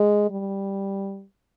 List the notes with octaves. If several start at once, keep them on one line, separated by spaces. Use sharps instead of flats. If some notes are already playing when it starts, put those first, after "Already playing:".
Already playing: G#3
G3